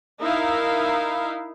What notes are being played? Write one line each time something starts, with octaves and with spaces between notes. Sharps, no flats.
D#4 E4 A#4 E5 F5